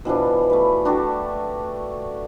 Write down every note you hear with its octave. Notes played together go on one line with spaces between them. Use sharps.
B2 E3 F3 D4
A3 B4
D4 F#4 G4 A4